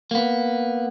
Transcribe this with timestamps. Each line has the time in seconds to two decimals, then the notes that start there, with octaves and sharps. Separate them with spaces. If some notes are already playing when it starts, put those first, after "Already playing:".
0.11 A#3 B3